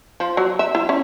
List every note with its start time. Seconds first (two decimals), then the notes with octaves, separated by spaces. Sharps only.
0.20 F3
0.37 F#3
0.59 E5
0.75 E4
0.89 C#4